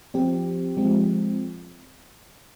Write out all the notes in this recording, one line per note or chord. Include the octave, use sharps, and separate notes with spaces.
F3 C4 G4
F3 G#3 C4